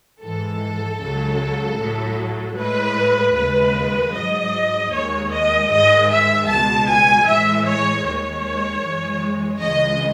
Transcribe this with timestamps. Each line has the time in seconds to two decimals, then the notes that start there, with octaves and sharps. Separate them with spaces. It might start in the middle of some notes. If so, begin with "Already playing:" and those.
0.22 G#2 E3 G#3 A4
1.01 C#2 C#3 F#3
1.78 A2 F#3
2.56 A2 G#3 B4
3.34 D#2 C#3 G#3 B4
4.13 G#2 F#3 D#5
4.92 D#2 D#3 G#3 C#5
5.31 D#5
5.70 G#2 D#3 G#3 D#5
6.08 E5
6.48 C#2 B2 G#3 A5
6.87 G#5
7.26 A2 E3 G#3 E5
7.65 C#5
8.04 D#2 D#3 G#3 C#5
8.83 F#2 E3 G#3
9.61 C#2 C#3 E3 G#3 D#5